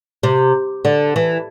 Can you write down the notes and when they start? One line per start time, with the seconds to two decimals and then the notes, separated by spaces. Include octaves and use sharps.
0.23 C3
0.85 D3
1.16 E3